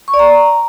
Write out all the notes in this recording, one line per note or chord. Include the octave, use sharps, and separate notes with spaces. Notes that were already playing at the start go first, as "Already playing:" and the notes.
C#6
D5
A#5